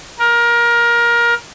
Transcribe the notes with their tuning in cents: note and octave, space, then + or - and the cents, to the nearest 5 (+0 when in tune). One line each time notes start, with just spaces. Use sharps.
A#4 +20